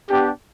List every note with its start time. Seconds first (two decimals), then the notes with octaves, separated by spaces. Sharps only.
0.10 B3 D4 G4